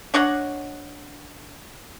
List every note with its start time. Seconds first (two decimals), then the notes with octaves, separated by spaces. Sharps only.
0.14 D4 C#5 D#5 F#5